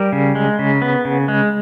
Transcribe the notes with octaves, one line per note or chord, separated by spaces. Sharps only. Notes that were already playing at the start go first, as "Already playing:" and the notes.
Already playing: G3 A#4
C#3
G#3
C#3
B3
C#3
G#3